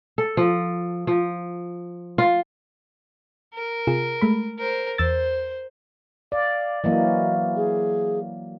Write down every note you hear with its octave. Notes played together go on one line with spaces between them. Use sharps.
A4
F3
F3
F4
A#4
C3 F4 G#4
G#3 A3 B5
A#4 C5
E2 C5 E6 A6
D5 F5
E3 F#3 A#3 D#5
G#4